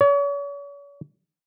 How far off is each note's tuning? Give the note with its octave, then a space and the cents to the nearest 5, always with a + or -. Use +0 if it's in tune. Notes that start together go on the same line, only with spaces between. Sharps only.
C#5 +40